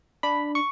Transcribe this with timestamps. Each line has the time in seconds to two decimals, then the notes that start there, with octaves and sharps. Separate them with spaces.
0.23 D4 B5
0.55 C#6